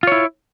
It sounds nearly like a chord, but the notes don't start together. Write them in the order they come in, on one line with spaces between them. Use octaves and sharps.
F4 C#5 E4